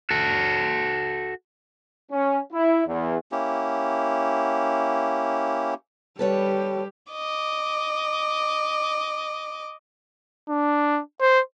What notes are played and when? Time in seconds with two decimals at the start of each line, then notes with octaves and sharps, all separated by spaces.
0.10 F#4 A4
2.11 C#4
2.52 E4
2.87 E2
3.32 A#3 C#4 E4 G4
6.19 G3 G4 A4 B4 C#5
7.12 D#5 D6
10.49 D4
11.20 C5